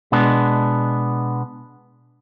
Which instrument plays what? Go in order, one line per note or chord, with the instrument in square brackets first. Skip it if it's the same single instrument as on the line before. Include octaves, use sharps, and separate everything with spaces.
[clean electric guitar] B2 G#3 B3 D4